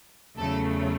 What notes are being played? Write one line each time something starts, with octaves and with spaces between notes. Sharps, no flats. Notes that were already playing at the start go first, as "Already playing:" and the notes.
E2 C#3 F#3 A3 A4